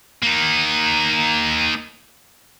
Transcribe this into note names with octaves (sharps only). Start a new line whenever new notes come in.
A#3 D#4